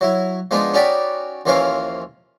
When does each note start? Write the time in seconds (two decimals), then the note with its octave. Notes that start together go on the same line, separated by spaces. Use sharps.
0.01 F#3 E4
0.51 F3 G#3 B3 D4 D#4
0.74 C#4 D#4 F#4 D5 G5 B5
1.46 D#2 E3 F3 C#4 A#4 F5